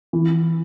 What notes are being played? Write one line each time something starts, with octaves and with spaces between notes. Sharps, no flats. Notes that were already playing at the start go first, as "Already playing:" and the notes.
E3